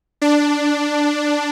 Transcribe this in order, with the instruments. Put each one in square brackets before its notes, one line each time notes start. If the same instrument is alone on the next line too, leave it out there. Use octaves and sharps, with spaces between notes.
[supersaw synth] D4